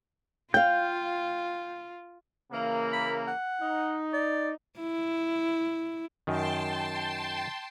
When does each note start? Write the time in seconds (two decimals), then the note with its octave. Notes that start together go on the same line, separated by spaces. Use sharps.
0.54 F4 F5 G5 G6
2.52 C#3 E3 A#3
2.93 B5
3.28 F#5
3.61 D#4
4.14 D5
4.80 E4
6.27 F#2 D#3 G5 A5 C6